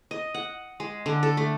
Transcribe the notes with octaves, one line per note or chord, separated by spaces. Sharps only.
D#5
F#5
G#3
D3
A4
A3